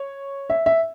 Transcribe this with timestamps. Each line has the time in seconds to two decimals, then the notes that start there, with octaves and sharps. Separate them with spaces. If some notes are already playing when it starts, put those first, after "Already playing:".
Already playing: C#5
0.50 E5
0.66 E5